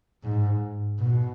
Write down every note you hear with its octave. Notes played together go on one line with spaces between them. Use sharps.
G#2
B2